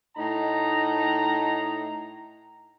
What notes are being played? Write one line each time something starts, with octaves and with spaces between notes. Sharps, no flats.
A2 D#4 A#5